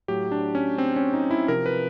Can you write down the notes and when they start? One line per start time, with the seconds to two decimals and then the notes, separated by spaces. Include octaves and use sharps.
0.08 A2 F#3 G4
0.32 D4
0.55 C#4
0.78 C4
0.96 C#4
1.13 D#4
1.31 E4
1.48 C3 F3 A#4
1.66 B4